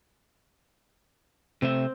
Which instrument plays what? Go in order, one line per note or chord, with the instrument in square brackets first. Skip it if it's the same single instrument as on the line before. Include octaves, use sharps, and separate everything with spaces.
[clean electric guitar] C3 A3 E5 [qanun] C4